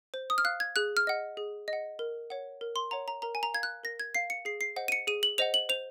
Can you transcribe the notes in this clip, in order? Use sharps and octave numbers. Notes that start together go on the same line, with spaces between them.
C5
D#6
F6
F5 F#6
G#6
G#4 F#6
F6
D#5 F#5
G#4
D#5
F#5
A#4
C#5 F#5
A#4
C6
C#5 F#5 A#5
A#5
A#4 A#5
G#5
A#5
F5 G#6
F#6
A#4 A#6
G#6
F5 C7
C#7
G#4 C7
C7
C5 D#5 F#5
D#7
C#7
G#4 D#7
F#7
C5 D#5 F#5 F7
F#7
C5 F7